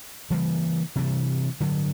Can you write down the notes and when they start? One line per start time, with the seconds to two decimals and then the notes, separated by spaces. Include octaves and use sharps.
0.30 C#3 E3 G3 A#3
0.96 C3 E3 G3
1.60 G2 D3 F#3